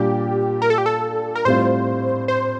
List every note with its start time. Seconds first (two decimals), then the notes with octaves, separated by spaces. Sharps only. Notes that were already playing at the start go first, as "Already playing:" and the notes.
Already playing: A#2 G3 D4 G4
0.62 A#4
0.70 A4
0.78 G4
0.86 A4
1.35 A#4
1.45 A2 G3 C4 F4 C5
2.28 C5